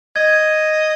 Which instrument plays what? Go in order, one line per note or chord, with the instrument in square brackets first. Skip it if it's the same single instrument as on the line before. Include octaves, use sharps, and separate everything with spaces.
[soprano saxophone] D#5 [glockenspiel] G#6